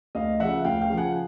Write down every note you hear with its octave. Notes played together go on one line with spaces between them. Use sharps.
D2 D#5 F5
C#3 F3 E5 F#5
D2 F5 G5
F5 G5
C#3 F3
F#5 G#5